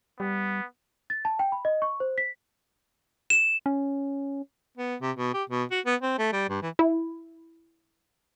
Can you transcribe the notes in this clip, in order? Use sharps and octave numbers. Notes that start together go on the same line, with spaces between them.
G3 B3
A6
A5
G5
B5
D#5
C#6
C5
B6
E7
C#4
B3
C3
B2
G4
B2
F#4
B3
C4
A3
G3
G2
E3
E4